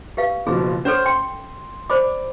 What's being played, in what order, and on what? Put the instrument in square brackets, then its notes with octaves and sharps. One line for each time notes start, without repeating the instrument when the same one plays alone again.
[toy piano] G4 B4 F5
[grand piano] F#1 B2 F3 [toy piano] G#4
[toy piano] C#4 A4 [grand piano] C5 C#5 F6
[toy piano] G5 [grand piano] C6
[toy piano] C5 B5 D6 [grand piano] D5